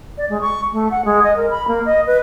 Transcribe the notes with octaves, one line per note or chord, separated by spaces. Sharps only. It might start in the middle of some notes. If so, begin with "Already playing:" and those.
D5
G#3
C#6
A3
F#5
G#3
D#5
A#4
B5
A#3
D#5
B4